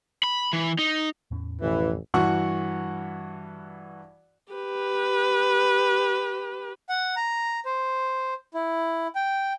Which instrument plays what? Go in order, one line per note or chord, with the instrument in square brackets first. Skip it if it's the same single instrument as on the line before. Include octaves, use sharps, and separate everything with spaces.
[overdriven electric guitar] B5
E3
D#4
[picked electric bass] E2 A2 C#4
[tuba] A1 [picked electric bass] F2 B2 F3 [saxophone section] E3
[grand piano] G2 E3 F#4 F#5 C#6
[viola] G4 B4
[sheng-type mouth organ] F#5
A#5
C5
E4
G5